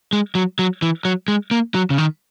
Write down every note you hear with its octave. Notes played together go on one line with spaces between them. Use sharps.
G#3
F#3
F#3
E3
F#3
G#3
A#3
F#3
C#3
D#3